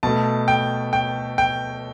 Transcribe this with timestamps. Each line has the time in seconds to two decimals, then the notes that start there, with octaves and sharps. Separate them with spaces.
0.03 B2 A3 A5
0.48 G5
0.93 G5
1.38 G5